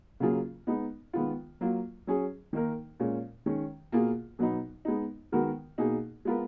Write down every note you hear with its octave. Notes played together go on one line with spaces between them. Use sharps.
C#3 F#3 A#3 F4 G#4
G#3 B3 D#4
D#3 G#3 B3 F4
F#3 A#3 F4
F#3 C#4 G#4
D#3 A#3 D#4 A#4
A#2 G#3 C#4
D#3 G#3 C#4
B2 A#3 F4 G#4
B2 F#3 B3 D#4
G#3 B3 D#4
D#3 G#3 B3 F#4 A#4
B2 A#3 D#4 G#4
G#3 B3 F4 A#4